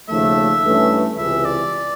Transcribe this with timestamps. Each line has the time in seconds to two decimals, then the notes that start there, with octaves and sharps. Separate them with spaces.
0.09 D#2 C#3 F3 A3 E5
0.64 G2 E3 A3 C#4
1.18 C#2 C3 E3 E5
1.45 D5